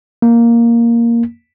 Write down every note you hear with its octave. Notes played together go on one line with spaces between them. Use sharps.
A#3